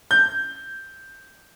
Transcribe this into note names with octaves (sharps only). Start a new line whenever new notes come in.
G6